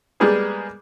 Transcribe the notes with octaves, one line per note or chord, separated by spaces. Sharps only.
G3 G#3 A#3 B3 G#4